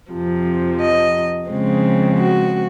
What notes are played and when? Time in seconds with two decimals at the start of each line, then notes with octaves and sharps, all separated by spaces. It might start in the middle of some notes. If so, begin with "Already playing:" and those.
0.11 F2 C3 F3
0.80 D#5
1.49 C#3 F3 G#3 C4
2.19 F#4